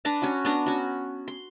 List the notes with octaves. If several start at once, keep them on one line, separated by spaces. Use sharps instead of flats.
D4 B4 A5 A#5
C#4 F#4
B3 D4 A#5
C#4 F#4
C6